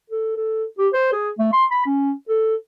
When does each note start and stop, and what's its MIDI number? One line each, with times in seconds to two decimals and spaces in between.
0.10 0.34 69
0.37 0.64 69
0.78 0.88 67
0.93 1.12 72
1.13 1.29 68
1.39 1.49 57
1.53 1.65 84
1.71 1.81 83
1.86 2.12 61
2.29 2.55 69